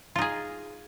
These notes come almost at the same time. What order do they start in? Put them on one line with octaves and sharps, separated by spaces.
F4 D#4 G#4